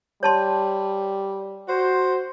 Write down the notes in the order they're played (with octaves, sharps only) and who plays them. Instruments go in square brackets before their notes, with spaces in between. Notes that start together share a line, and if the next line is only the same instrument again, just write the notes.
[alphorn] G3 [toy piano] C#5 A5 C6
[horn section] F#4 C5